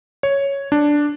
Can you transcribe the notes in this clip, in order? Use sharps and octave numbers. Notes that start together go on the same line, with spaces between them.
C#5
D4